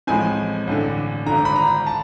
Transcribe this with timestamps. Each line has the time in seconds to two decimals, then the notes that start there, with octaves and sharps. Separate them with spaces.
0.07 A1 A2 F3 G#3 C4 G#5
0.67 A1 G2 D3
1.26 G#1 G2 D3 A#5
1.45 B5
1.56 A#5
1.86 A5